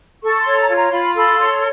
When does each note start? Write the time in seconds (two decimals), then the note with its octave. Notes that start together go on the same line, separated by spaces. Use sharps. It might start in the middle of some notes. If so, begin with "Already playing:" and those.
0.23 A4 C#6
0.40 C6
0.47 C#5
0.59 A#5
0.69 F4
0.75 A#5
0.89 C6
0.92 F4 B5
1.16 A4 B5
1.39 C#5 C6